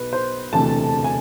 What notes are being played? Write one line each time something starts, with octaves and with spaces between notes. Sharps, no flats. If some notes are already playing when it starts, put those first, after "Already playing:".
Already playing: B1 B2 B4
C5
E1 D2 C3 E3 A3 A5
G#5